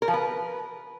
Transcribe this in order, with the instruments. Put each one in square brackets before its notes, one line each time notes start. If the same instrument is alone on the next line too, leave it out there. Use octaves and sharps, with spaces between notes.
[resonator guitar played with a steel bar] A#4
F3
B4